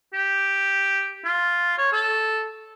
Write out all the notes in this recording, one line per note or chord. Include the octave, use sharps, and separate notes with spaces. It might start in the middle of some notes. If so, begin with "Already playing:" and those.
G4
F4
C#5
A4